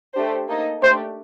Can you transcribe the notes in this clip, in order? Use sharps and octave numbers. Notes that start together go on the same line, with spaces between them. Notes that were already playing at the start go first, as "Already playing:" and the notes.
A3 D4 G4 C5
A#3 D#4 A4 D#5
A3 D4 G4 C5